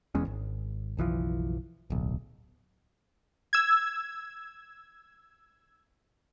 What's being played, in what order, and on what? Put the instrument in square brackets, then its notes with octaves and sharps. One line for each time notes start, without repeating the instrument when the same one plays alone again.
[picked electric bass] E1 E2 G#3 C#4
G#1
F#1 B1 E3 F3
D1 B1
[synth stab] E6 G#6